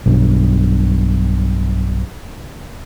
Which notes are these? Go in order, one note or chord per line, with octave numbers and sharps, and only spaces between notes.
B1 G2